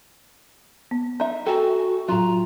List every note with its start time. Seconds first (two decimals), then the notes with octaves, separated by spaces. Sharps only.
0.91 B3
1.20 D#4 E5
1.46 F#4 A4 G5 G#5
2.08 A2 F#3 F4 A#5